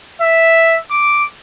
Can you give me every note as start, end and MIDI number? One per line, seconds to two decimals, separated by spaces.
0.21 0.77 76
0.91 1.25 86